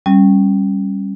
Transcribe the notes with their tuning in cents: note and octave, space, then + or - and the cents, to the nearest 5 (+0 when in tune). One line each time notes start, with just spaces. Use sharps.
G3 +0 C#4 -15